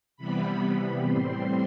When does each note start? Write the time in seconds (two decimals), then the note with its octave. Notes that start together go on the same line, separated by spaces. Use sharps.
0.17 C3 E3 G3 B3 B5
1.03 A2 G3 C4 C6